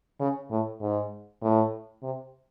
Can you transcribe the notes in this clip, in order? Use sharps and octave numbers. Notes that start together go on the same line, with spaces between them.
C#3
A2
G#2
A2
C3